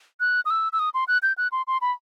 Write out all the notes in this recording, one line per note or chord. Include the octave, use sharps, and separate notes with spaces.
F#6
D#6
E6
E6
D#6
C6
F#6
G6
F#6
C6
C6
B5